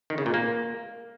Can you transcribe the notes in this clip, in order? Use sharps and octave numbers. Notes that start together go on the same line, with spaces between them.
D#3
C#3
A#2
A#3